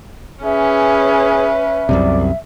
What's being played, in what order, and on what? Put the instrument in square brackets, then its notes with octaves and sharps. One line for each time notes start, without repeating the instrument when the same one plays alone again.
[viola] C#4 B4 [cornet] G#4 [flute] E5
[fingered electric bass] C2 F#2 C3 [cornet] D5